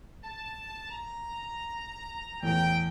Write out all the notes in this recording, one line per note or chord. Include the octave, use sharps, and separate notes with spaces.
A5
A#5
E2 A2 G5